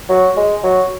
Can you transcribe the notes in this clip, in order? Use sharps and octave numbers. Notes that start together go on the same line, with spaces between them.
F#3
G#3
F#3